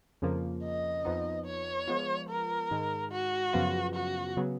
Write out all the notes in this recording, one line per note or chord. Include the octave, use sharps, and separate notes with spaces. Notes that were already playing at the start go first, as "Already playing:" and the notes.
F2 C#3 F3 A#3
D#5
F2 F3 B3 D#4
C#5
F3 G#3 B3 F4
A#4
G#2 D#3 G#3
F#4
F#2 C#3 F3 B3 F4
F#4
C#3 F#3 B3